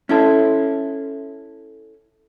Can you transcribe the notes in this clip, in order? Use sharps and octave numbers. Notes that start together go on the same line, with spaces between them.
C#4 E4 A4